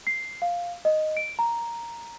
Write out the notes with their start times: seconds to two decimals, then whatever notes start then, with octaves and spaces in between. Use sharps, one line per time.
0.07 C7
0.42 F5
0.85 D#5
1.17 D7
1.39 A#5